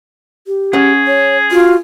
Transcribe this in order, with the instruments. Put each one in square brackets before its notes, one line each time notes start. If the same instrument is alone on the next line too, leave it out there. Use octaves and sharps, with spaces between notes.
[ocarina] G4
[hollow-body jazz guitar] C#4 F#5 [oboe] G#4
[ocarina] C#5
[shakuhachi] F4 [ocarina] F#4